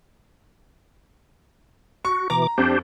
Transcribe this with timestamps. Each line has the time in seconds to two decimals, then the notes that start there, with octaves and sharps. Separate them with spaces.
2.05 F#4 C#6
2.30 B2 E3 A#5 D6
2.58 F2 D4 G4 C5